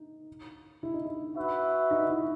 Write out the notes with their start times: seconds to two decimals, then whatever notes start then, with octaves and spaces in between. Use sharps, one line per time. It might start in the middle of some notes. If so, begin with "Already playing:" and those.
Already playing: D#4
0.83 E4
0.94 D#4
1.05 E4
1.36 F#4 B4 E5
1.91 D#4
2.09 E4